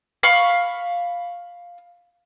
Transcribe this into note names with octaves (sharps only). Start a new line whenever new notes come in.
F5 B5 C#6